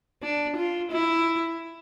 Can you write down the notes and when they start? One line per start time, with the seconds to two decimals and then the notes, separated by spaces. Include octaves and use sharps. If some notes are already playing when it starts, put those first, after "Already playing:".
0.22 D4
0.57 F4
0.91 E4